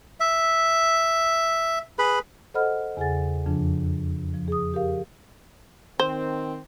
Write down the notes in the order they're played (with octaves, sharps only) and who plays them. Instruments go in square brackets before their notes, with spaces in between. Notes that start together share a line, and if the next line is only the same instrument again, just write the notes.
[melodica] E5
G#4 B4 B5
[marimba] A4 C5 D#5 F#5 B5 F6
E2 C#3 G#4 F#5 G#5 A6
F2 C#3 F3 D4
F3
G#4 D#6
G4 A#4 F5
[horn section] D#3 C4 [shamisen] C5